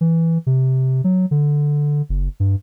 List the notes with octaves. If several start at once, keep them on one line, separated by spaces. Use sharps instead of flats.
E3
C3
F#3
D3
F#1
G2